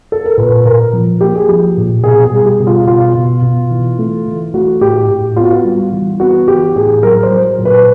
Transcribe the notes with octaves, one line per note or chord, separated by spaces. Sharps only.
A4
A#4
A#2 B4
A#2 A#4
F3
A#3 G4
G#4
F3 G4
A#2
B2 G#4
G#4
G3
G4
B2
F4
B2 F4
B2
B2
E3
A3
E3
A3 F#4
A2 G4
A2
B3 F4
F#4
F4
G3
E3
B3 F#4
E3 G4
A2 G#4
F#3 A#4
C5
F#3
A#2
B4